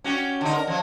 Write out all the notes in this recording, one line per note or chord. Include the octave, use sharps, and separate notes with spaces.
C#4 F#4 G4
D3 D#4
A#4
F3 F#3